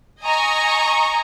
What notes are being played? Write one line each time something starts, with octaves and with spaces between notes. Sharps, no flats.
D#5 G#5 A#5 C#6